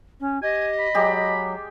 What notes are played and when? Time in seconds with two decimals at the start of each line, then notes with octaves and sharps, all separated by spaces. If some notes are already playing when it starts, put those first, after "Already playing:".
0.20 C#4
0.42 G4 D#5 G#5
0.79 B5
0.94 F#3 G#3 G4 D5